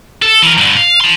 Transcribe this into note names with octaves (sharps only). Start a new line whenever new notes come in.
A4
E3 A#4
G2 D3
F5
A5 C6